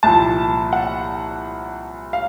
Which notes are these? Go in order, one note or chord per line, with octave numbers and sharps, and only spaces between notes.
C2 A#2 F3 A5
F#5
F5